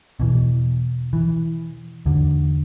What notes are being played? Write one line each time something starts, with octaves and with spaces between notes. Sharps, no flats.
E2 B2 E3
E3
E2 D3